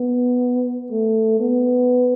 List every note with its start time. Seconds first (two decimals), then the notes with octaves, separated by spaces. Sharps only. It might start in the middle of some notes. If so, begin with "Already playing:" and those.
Already playing: B3
0.91 A3
1.40 B3